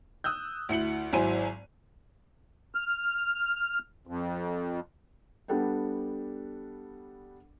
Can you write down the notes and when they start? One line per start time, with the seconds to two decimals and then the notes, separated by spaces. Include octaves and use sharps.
0.24 D#6 E6 F#6 G6
0.69 D2 E4 C#7 F#7
1.13 G#1 F#3 E4 C5 G#5 D#7
2.75 F6
4.07 F2
5.48 G3 B3 D4 A4 F#5 G5